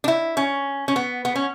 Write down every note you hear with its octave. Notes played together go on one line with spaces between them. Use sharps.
D4
E4
C#4
C#4
B3
B3
C#4